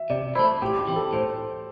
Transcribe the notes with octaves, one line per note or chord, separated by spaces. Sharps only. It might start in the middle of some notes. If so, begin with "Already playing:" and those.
Already playing: E5
C3 D5
A3 E4 C5
A2 G4
G4
E3 C4
A4
A2 C5